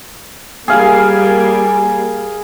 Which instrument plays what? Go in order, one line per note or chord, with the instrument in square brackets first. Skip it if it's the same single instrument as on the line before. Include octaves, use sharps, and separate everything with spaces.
[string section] G3 A#3 [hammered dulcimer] G#4 F5 G#5